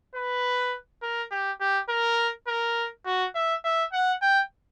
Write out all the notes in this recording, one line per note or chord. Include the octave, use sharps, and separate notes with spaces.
B4
A#4
G4
G4
A#4
A#4
F#4
E5
E5
F#5
G5